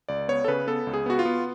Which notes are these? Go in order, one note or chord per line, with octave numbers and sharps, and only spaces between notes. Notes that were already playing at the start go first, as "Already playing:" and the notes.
C#2 D5
B3 C#5
A4
C#3 B4
B3 A4
C#2
G#4
B3 F#4
F4
B3